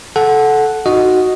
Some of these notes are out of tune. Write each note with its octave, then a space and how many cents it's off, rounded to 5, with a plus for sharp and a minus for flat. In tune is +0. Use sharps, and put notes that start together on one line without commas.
A4 -15 F#5 +0
D#4 +0 F#4 +0 D#5 +0